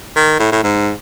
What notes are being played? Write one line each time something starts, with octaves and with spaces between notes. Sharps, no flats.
D#3
A2
A2
G#2